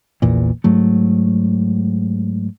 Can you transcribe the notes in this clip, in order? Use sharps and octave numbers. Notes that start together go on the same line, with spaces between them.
A#1 E2 A#2
G#2 F#3 A3